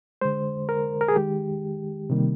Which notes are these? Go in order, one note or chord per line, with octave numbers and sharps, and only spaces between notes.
D3 G#3 C5
A#4
A#4
G#4
D#3 G#3 G4
C3 D#3 G3 A#3